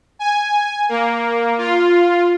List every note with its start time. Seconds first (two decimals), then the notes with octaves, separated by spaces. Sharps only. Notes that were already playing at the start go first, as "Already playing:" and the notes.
0.19 G#5
0.89 A#3
1.58 F4